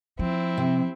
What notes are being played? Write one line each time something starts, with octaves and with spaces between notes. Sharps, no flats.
F3 C4 E4
C3